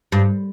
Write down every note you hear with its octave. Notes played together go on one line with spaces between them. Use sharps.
G2